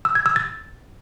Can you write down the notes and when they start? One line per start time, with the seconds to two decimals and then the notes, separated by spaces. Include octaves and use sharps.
0.05 E6
0.15 G#6
0.26 E6
0.36 A6